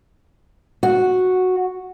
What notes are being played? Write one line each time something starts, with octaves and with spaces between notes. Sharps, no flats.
F#4